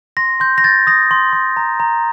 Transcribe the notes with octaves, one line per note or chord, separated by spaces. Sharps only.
C6 A#6
C6 G6
A#6
G6 A6
D#6 A#6
C6
C6
A#5
A#5